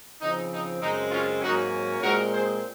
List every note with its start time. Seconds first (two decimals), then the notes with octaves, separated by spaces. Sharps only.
0.20 C#3 F3 C4 D#4
0.51 D#4
0.81 F#2 C#3 G#3 C4 D#4
1.11 C#4 F4
1.42 G#2 F#3 A#3 C#4 D#4 F#4
2.02 A#2 G#3 C4 F#4 A#4
2.33 G#4 C5